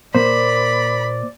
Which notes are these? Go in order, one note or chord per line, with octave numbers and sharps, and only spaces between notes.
A#2 A#3 C5 D5 B5